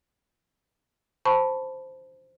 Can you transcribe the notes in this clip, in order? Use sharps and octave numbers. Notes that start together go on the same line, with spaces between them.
C5 A5 B5 C#6